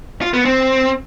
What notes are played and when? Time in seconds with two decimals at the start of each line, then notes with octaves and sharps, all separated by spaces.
0.22 F4
0.33 B3
0.45 C4